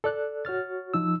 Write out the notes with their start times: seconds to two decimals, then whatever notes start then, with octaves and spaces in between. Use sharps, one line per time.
0.04 A4 D5 F#6
0.45 F#4 C#5 F6 A6
0.94 F3 D#4 E6